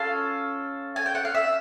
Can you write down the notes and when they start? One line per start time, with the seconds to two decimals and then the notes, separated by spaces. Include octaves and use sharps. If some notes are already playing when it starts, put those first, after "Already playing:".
Already playing: C#4 F4 A4 F5
0.96 G#5
1.06 G5
1.15 F#5
1.25 F5
1.35 E5